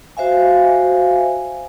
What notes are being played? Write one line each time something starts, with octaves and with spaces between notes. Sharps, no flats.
F#4 C5 E5 F5 G#5